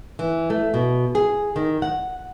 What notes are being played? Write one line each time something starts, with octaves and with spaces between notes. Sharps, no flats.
E3
A3
B2
G#4
D#3
F#5